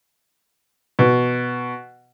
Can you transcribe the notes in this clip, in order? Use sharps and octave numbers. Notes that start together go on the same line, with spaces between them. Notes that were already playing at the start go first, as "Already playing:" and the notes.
B2